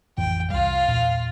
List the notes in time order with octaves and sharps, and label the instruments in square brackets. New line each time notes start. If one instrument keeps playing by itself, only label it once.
[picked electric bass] A1 F2 E3 [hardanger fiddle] G5
[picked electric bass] C2 G3 [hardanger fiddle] F4 F5
[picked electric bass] E2 A#2